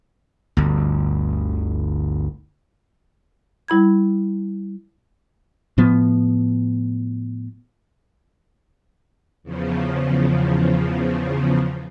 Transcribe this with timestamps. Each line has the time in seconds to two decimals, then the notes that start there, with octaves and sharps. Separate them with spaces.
0.57 G1 D2
3.68 G3 E4 B5 G#6
5.78 A2 F3 B3
9.43 E2 C#3 F3